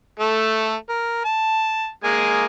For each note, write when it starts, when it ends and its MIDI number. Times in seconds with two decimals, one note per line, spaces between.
0.19 0.75 57
0.19 0.75 69
0.89 1.23 70
1.24 1.90 81
2.04 2.45 56
2.04 2.45 58
2.04 2.45 80